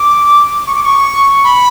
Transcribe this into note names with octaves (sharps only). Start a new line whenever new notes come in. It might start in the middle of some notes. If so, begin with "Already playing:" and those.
Already playing: D6
C#6
D6
C#6
B5